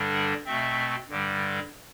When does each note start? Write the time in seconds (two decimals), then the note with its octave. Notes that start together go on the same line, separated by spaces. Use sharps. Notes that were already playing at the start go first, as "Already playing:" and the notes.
Already playing: G2 D3 G3 D4
0.14 F#5
0.46 B2 A3 C4 E5
1.09 G2 D3 G3